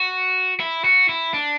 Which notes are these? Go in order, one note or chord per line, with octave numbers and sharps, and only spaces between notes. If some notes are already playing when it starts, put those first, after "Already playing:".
Already playing: F#4
E4
F#4
E4
D4